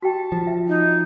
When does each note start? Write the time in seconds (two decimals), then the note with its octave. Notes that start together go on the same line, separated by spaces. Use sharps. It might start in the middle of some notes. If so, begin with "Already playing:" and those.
0.02 F#4 G4 G5 A5
0.32 F3
0.47 E5
0.68 D#4